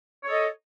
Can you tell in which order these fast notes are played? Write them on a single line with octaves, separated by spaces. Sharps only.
C#5 A4 D#5